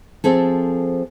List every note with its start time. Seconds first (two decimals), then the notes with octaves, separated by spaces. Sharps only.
0.24 F3 C4 G#4 A4